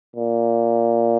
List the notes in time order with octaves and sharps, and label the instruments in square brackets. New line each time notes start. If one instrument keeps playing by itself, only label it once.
[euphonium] A#2